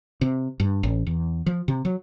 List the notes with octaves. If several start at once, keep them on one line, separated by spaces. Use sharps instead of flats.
C3
G2
A1
E2
F3
C3
F#3